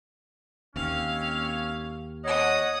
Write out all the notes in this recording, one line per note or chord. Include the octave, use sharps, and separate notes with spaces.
D#2 A#3 C4 C#4 F5
C#5 D#5 F#5 D#6